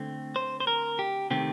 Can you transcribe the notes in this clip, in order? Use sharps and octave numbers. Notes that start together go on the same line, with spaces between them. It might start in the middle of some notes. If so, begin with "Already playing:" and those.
Already playing: D3 A3 C4
C5
C5
A#4
G4
C3 D#3 A3 C4 G4